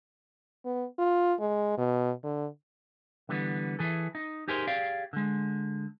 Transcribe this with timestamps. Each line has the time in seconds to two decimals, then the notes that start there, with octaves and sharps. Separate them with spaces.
0.65 B3
0.99 F4
1.40 G#3
1.78 B2
2.23 D3
3.29 D3 E3 G3 B3
3.79 E3 G#4 A4
4.15 D#4
4.48 D#4 G4 G#4 A#4 C5
4.67 G4 G#4 D5 F5
5.13 D3 G#3